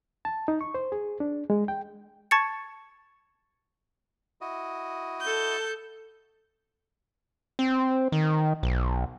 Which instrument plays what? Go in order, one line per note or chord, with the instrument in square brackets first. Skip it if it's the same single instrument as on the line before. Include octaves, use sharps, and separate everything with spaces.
[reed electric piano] A5
D#4
C#6
C5
G#4
D4
G#3
G5
[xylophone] A5 C#6 G#6 A6 C#7
[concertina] E4 F#4 D#5
[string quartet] A4 G6
[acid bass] C4
D#3
B1